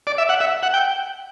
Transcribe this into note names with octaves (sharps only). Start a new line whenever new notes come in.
D5
E5
F#5
E5
F#5
G5